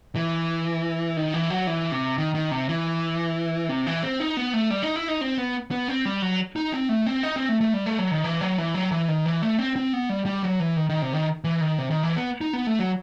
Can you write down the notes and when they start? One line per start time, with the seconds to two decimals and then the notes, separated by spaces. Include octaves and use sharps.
0.16 E3
1.17 D#3
1.34 E3
1.50 F#3
1.67 E3
1.92 C3
2.18 D#3
2.35 D#3
2.51 C3
2.69 E3
3.69 C3
3.86 E3
4.03 C4
4.20 D#4
4.37 B3
4.53 A3
4.70 G3
4.82 D#4
4.96 E4
5.08 D#4
5.21 C4
5.38 B3
5.71 B3
5.88 C4
6.05 G3
6.22 F#3
6.56 D#4
6.73 C4
6.89 A3
7.06 C4
7.23 D#4
7.36 C4
7.49 A3
7.61 A3
7.74 G3
7.86 A3
7.99 F#3
8.11 D#3
8.24 E3
8.41 F#3
8.58 E3
8.74 F#3
8.92 E3
9.08 D#3
9.25 E3
9.42 A3
9.59 C4
9.76 C4
9.93 B3
10.09 G3
10.26 G3
10.43 F#3
10.60 E3
10.77 D#3
10.89 D#3
11.02 C3
11.14 D#3
11.44 E3
11.61 D#3
11.78 C3
11.90 D#3
12.03 E3
12.16 B3
12.41 D#4
12.53 B3
12.67 A3
12.79 F#3